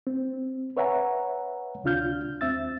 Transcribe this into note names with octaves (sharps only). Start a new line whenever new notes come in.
C4
B4 C#5 E5 F#5 G#5 A#5
D2 C3 D4 F4 F6 G6
D#2 C4 E5 E6 A6